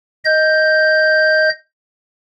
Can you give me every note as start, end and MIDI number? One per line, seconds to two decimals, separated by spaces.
0.25 1.49 75
0.25 1.49 91